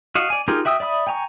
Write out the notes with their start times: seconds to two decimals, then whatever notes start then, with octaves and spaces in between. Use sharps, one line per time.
0.15 F#4 D#5 F5
0.30 D5 G#5
0.48 D#4 F4 G4 G#4 A#4
0.65 F#4 E5 G5 D#6 E6
0.80 D5 E5 B5 D#6
1.07 G5 G#5 A#5 C#6